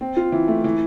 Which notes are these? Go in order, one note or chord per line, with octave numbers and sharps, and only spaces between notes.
C4
F4
E3
A3
E3